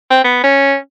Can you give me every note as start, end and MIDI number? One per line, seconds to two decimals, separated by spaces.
0.11 0.21 60
0.24 0.44 59
0.44 0.75 61